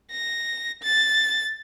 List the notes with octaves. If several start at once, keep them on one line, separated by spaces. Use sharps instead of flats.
A#6
A6